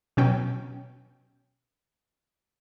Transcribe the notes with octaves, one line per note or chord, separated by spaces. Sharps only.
B2 F#3 C#4 G5